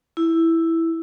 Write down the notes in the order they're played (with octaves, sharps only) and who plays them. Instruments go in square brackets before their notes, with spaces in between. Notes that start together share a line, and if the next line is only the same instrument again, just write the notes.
[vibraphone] E4